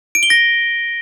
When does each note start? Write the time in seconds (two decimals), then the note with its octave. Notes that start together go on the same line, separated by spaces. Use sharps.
0.15 D7
0.23 G7
0.30 A#6